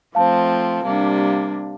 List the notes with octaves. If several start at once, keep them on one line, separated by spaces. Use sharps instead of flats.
F3 A3 C4 F5 A5
C3 G3 A#3 D4